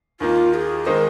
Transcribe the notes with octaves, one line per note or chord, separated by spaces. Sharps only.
D#2 D#3 A#3 F4
G#4
D#3 G#3 D#4 A#4 C5